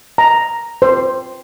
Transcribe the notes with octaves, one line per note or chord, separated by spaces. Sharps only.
A#5
C5